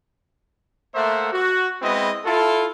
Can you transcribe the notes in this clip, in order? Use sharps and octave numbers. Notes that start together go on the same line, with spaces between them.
A3 A#3 C5 E5 F#5
F#4
G#3 B3 C4 E4 D#5
E4 F4 A4